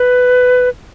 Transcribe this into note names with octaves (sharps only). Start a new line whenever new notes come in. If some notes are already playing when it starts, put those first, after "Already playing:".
Already playing: B4